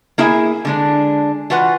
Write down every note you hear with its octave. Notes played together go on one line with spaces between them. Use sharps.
A#3 E4 G#4 E5 G#5
D3 G#3 D4
E3 F4 F#4 B4 F#5